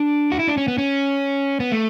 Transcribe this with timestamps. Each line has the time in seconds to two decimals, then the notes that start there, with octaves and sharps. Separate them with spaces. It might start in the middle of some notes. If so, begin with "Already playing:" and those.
Already playing: D4
0.32 F#4
0.39 E4
0.47 D4
0.58 C#4
0.68 B3
0.78 C#4
1.60 B3
1.72 A3